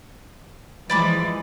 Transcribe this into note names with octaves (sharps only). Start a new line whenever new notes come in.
E3 F3 G#3 D5 B5 D6